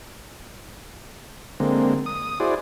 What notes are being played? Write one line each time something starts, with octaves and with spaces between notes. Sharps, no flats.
D3 G#3 A#3 C4
D#6
E4 F#4 G#4 C5 D5